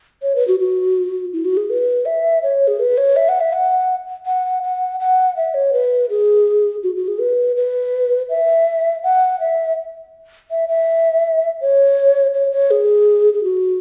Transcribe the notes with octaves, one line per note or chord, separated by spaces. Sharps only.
C#5
B4
F#4
F#4
E4
F#4
G#4
B4
E5
C#5
G#4
B4
C#5
E5
F#5
E5
F#5
F#5
F#5
F#5
E5
C#5
B4
G#4
F#4
F#4
G#4
B4
B4
E5
F#5
E5
E5
E5
C#5
C#5
C#5
G#4
G#4
F#4